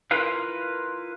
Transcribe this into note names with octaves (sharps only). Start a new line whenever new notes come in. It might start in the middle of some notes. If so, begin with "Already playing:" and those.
E4 F4 A#4 B4 F5